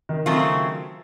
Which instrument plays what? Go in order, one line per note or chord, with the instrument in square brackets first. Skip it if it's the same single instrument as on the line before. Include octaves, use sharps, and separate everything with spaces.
[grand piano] D#3
[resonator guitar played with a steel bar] C#3 F#3 A3 C4 F4